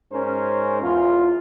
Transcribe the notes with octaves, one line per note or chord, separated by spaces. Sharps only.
G#2 C#4 A#4 C5
E2 F4